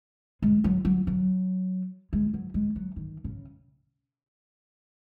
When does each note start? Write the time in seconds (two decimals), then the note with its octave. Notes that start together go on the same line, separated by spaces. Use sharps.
0.42 G#3
0.64 F#3
0.85 F#3
1.07 F#3
2.13 G#3
2.34 F#3
2.54 G#3
2.76 F#3
2.96 D#3
3.24 C#3